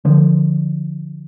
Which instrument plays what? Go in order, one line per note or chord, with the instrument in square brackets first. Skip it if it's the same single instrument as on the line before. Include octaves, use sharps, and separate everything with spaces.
[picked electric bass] D3 F3